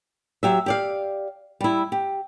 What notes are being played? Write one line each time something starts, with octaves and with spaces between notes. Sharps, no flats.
F#3 G4 E5
G4 D5 F5
G3 E4
G4